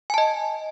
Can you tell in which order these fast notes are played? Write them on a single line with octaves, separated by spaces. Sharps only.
G#5 A5 D#5